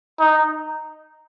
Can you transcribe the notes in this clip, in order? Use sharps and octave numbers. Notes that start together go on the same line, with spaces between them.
D#4